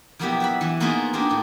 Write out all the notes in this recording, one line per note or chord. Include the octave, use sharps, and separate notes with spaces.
F3 F#3 A#3 B3 E4 G4
F#4 E5 B5
E3 F#4
A#3 B3 D#4 F4 F#4 G#4
A#3 D4 D#4 F4 G4
A2 D5